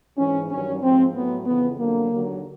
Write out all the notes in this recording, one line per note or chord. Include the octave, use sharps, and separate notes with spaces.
G#2 E3 C#4
G2 D#3 F#3 C#4
G#2 F3 C4
A2 F#3 B3
F2 C#3 E3 B3
F2 D3 F#3 A#3
D#2 D3 F#3